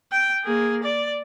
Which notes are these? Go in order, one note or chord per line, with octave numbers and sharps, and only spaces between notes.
G5
A#3 G#4
D5